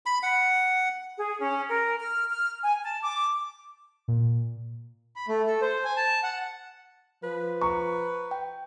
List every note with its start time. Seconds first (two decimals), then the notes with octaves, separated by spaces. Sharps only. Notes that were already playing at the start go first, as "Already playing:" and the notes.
0.06 B5
0.23 F#5
1.18 G#4
1.40 C#4
1.69 A#4
1.99 F6
2.30 F6
2.62 G#5
2.83 A5
3.02 D6
4.08 A#2
5.16 B5
5.28 A3
5.47 A4
5.62 C5
5.85 G#5
5.97 A5
6.23 F#5
7.23 F3 B4
7.61 A#5 C#6
8.31 G5